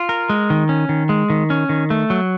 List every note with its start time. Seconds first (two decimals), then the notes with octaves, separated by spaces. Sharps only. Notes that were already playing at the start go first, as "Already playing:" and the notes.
Already playing: F4
0.09 A#4
0.29 G#3
0.50 D#3
0.69 C#4
0.89 D#3
1.09 G#3
1.30 D#3
1.50 C#4
1.69 D#3
1.90 A3
2.10 F#3